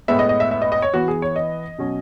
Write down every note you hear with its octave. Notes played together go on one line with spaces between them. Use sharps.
A2 G#3 B3 E5
D#5
D#5
E5
E5
D#5
D#5
C#5
E3 B3 F#4
G#4
C#5
D#5
B2 F#3 C#4